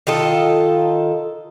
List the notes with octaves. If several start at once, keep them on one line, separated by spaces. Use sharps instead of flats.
D#3 F4 A4 D#5